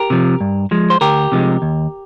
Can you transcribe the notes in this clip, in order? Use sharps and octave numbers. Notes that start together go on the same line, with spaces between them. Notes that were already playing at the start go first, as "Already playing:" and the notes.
Already playing: G4 A#4
C3 F3
G2
F3 G#3
C5
D2 G4 A#4
C3 F3 G#3
D#2